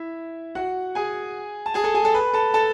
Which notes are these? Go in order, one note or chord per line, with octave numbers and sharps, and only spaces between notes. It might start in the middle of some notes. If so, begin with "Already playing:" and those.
Already playing: E4 E5
F#4 F#5
G#4 G#5
A5
G#4 G#5
A4 A5
G#4 G#5
A4 A5
B4 B5
A4 A5
A4 A5